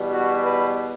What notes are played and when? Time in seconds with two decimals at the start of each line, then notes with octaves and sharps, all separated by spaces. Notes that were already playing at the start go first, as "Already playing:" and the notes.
Already playing: E2 B2 G3
0.12 F#4
0.44 B4